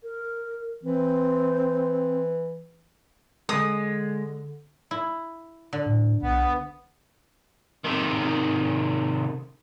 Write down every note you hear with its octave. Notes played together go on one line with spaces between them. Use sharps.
A#4
E3 C4
D3 G#3 D#6
E4
D3
A2
B1 B3
C3 D#3